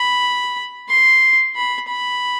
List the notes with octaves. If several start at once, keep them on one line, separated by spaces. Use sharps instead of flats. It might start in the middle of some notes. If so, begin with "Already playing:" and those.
Already playing: B5
C6
B5
B5